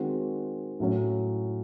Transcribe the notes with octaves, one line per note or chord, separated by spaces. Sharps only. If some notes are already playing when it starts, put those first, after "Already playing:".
Already playing: D#3 G#3 C4 F#4
A2 F#3 C#4